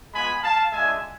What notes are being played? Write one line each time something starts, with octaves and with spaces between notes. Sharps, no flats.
G#3 B3 F4 G#5 B5
F5 A5
G#3 D4 F4 E5 G#5